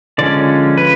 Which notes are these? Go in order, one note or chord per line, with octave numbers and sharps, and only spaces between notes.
D3 F3 G#3 C#4 D5
B4